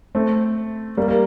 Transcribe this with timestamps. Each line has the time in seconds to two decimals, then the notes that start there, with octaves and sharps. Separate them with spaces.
0.15 A3 C4
0.97 G3 A#3
1.08 A#3